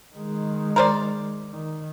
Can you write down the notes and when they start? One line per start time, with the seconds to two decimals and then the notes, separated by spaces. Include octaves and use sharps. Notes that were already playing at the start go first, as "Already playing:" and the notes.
0.15 D#3 G#3
0.76 A#4 C5 D5
1.50 D#3